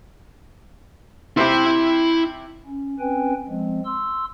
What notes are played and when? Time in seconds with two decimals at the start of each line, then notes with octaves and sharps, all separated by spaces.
1.37 C3 C4 E4 G4 B5
2.66 C#4
3.00 C4 C#4 B4 G5 G#5
3.48 F3 G#3 C4
3.85 C6 E6